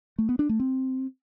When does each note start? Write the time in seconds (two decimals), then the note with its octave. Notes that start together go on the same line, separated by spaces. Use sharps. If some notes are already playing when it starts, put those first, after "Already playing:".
0.19 A3
0.29 B3
0.39 D4
0.49 A3
0.60 C4